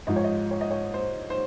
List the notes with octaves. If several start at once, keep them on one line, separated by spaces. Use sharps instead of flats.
G#2 F3 D#5
C#5
D#5
C#5
D#5
C#5
C5
C5